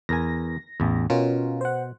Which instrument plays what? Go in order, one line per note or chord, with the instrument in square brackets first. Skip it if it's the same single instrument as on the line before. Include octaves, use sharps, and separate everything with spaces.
[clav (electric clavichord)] E2 A#4 G#5 [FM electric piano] A#6
[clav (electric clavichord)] A1 E2
[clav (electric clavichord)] B2 [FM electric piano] C#4 F4 A#4
[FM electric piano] C5 F#5